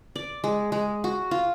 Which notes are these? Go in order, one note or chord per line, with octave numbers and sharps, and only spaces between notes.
D5
G#3
G#3
F#4
F4